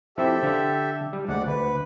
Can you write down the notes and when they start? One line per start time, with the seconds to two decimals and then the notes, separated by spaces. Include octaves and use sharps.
0.18 F3 C4 E4 G4 A4 E5
0.43 D3 D4 F5
1.13 G3
1.28 D2 G#3 D5 F#5
1.47 D2 B4